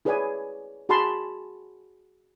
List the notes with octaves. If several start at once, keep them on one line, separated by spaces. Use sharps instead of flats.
E4 G#4 B4 C#5 D5 G#5
F#4 G#4 G#5 A5 B5 C6